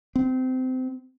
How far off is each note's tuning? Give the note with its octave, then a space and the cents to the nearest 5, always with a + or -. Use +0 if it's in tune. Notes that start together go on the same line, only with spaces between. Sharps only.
C4 -25